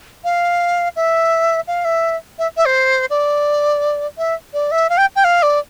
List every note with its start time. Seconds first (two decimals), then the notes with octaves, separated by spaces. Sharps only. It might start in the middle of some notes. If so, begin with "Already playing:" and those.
0.24 F5
0.96 E5
1.68 F5
1.85 E5
2.39 E5
2.57 E5
2.65 C5
3.10 D5
4.18 E5
4.53 D5
4.71 E5
4.90 F5
4.98 G5
5.16 G5
5.24 F5
5.42 D5